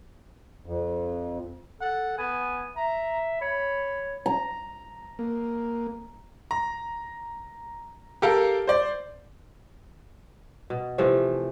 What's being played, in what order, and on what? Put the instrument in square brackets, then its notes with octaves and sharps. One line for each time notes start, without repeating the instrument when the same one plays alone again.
[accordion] F2
[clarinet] A4 [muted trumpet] F#5
[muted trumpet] B3 [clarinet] G#5
[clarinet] E5 [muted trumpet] A#5
[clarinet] C#5 [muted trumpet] B5
[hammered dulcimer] A#5
[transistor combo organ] A#3
[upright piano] A#5
G4 A4 A#4 F5
C5 D5
[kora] B2
C3 E3 F3 A3